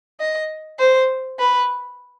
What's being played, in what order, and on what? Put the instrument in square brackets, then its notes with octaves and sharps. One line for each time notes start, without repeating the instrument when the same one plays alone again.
[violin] D#5
C5
B4